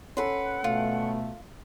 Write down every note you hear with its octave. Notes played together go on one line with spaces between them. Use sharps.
C#4 A4 B4 F#5 C6
B2 A3 F4